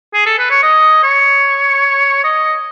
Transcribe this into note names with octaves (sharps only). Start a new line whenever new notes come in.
G#4
A4
B4
C#5
D#5
C#5
D#5